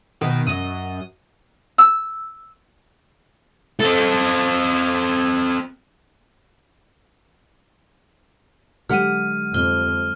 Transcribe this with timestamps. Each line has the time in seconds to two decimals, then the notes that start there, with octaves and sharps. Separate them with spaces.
0.21 B2 D#3
0.47 F#2 D#5 D#6
1.78 E6
3.80 C4 A4
8.90 D3 F#3 G#3 G4 F#5 F6 D#7
9.54 F2 F6 G7